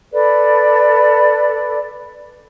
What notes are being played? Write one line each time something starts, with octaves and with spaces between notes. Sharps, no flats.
A4 B4 D5